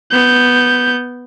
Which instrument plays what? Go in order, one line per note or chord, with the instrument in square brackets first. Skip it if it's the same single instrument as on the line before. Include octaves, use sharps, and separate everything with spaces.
[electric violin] B3 G6